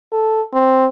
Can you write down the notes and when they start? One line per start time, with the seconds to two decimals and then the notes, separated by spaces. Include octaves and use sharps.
0.12 A4
0.53 C4